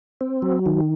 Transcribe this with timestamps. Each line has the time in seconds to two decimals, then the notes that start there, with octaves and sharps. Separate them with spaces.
0.21 C4
0.42 F#3
0.66 D#3